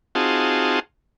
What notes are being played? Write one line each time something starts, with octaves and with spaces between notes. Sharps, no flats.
C4 D#4 F4 F#4 G#4 A5